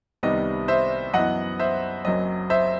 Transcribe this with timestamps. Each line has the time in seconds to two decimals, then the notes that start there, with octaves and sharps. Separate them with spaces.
0.23 C2 C3 D#3 G3 B3 D#5
0.68 C5 E5
1.14 F#2 E3 B3 D#5 F#5
1.59 C5 E5
2.05 F#1 F#2 F#3 C4 D#5
2.50 C5 E5